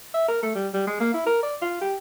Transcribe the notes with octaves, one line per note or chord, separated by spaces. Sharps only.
E5
A#4
A3
G3
G3
G#3
A#3
E4
A#4
D5
F4
G4